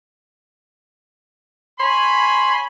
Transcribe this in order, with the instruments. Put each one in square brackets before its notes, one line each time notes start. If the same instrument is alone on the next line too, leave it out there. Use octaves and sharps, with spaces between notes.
[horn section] C#5 G#5 B5 [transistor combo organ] C6